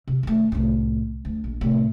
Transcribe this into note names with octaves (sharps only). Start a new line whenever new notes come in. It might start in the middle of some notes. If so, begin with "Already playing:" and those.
C3
D#3 A3
C2 A2
D2
A#1
A2 C3